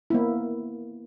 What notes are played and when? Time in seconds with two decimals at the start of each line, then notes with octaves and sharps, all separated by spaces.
0.10 A#3 B3 E4